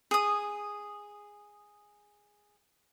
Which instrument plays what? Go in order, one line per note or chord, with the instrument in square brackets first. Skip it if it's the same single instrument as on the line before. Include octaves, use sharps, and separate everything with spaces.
[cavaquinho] G#4 D#6